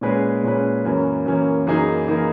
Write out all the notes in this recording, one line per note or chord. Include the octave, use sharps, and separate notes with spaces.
A#2 G#3 C#4 G#4 B4
A#2 G#3 C#4 G#4 B4
F#2 E3 A#3 C#4
F#2 E3 A#3 C#4
F#2 E3 A#3 D#4 G#4
E3 A#3 D#4 G#4